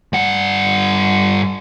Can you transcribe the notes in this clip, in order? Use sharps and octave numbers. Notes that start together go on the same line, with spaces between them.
G2 F#5